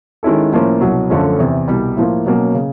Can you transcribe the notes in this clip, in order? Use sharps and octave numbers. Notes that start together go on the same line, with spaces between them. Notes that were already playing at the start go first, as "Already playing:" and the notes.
D#3 G#3 C#4 E4 A4
A2 F3 A#3 C#4
C2 B2 F#3
F#2 D3 F3 A3 C#4
E2 C3 E3
C2 B2 G3
A2 F3 A#3
B2 F#3 A#3 C#4
C#3